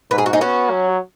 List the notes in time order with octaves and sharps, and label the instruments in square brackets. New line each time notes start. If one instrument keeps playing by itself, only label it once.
[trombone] G#2 [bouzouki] B4
[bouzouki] G#4
F#4
D#4 G#4
[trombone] B3 [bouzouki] C#4 F#4
[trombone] F#3